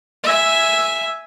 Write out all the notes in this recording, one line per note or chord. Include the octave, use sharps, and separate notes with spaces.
E5 G#5